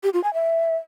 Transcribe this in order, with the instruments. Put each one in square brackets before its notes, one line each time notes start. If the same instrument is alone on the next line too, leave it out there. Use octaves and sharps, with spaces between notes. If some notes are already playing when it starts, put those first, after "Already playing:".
[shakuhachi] G4
F4
G#5
E5